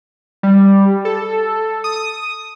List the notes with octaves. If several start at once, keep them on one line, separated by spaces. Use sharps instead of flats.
G3
A4
D#6